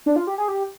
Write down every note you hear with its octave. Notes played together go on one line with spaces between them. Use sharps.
D4
F4
G4
G#4
G4